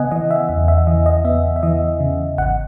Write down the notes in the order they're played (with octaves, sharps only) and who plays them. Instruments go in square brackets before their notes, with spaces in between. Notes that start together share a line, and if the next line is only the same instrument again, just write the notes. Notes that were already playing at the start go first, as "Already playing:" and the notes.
Already playing: [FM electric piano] C#3 B3 D#5 F#5 G#5
E3 D#5
E5
E2 E5
E5
E3 D#5
D#5
B3 E5
E5
E3 D#5
C#3
G#1 F#5